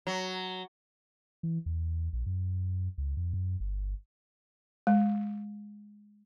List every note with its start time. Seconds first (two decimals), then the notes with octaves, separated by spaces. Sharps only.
0.07 F#3
1.43 E3
1.66 E2
2.13 A#1
2.26 F#2
2.98 C#2
3.17 F2
3.33 F#2
3.60 G1
4.87 G#3